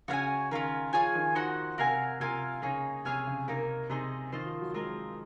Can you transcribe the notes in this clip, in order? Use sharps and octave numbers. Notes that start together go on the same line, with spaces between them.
C#3 F#4 C#5 F5 G#5
D#3 C#4 F4 A#4
F3 F4 G#4 C#5 G#5
D#3
D#4 F#4 C5 F#5
C3 F#4 A#4 F5 G#5
C3 F4 A#4 F5 G#5
C#3 A#3 D#4 G#4 C#5
C3 G#4 C#5 F5 G#5
C#3
C3 A#3 D#4 A#4 C#5
C3 D#4 G#4 C5 D#5
D#3 F4 C5 D#5
F3
F#3
G#3 C4 F4 A#4 D#5